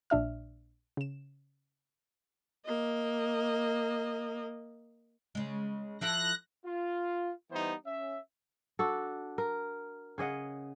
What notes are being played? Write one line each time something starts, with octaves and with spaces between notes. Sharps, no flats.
A#1 A#2 D4 E5 F6
C#3 E7
A#3 D#5
C#3 G#3
F3 E4 A4 F#6 A#6
F4
E3 G3 B3 D#4 C5
C#4 E5
D4 F#4 A4
A#4
C#3 G#4 D#5 F#5